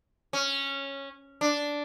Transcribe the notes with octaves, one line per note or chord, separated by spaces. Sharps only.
C#4
D4